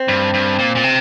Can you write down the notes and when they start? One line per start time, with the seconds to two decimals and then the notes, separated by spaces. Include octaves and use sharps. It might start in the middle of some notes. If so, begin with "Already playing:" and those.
Already playing: C4
0.08 G2
0.34 G2
0.59 A#2
0.76 A#2
0.84 C3